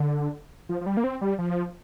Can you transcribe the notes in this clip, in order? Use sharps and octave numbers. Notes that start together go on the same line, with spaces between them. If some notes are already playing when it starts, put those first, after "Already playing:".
Already playing: D3
F3
F3
G3
A#3
C4
G3
F3